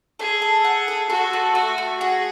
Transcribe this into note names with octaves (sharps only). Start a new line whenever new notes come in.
G#4 A4
A4
F#5
A4
F#4 A4
A3
A3 F#4
A3
F#4 G#4